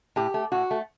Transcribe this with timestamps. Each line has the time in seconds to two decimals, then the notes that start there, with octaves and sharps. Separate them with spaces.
0.16 A2 G4
0.34 A3
0.52 A2 F#4
0.71 A3